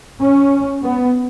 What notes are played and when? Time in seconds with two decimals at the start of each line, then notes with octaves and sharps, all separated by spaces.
0.20 C#4
0.82 B3